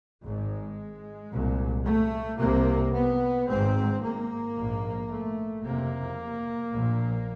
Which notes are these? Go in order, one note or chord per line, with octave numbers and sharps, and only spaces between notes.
G#1 G#2 G#3
C2 A#2
A3
C2 C3 A#3
B3
G#1 G#2 C4
A#3
A#1 G#2
A3
F#1 F2 C3 A#3
A#1 A#2